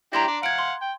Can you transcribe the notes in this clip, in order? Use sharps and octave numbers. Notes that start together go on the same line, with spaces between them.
D4 E4 G4 A#5 C6 A#6
D4 D5
F5 F#5 G#6 D7
C6
G5